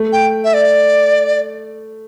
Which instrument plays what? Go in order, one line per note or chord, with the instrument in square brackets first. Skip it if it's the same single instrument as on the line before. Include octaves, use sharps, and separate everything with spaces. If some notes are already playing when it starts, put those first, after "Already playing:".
Already playing: [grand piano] A3
[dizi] G5
E5
D5